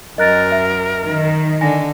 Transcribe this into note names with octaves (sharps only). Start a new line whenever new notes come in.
F#2 A#4 D#5 F#6 A6
E5
D#3
D3 G#5 A#6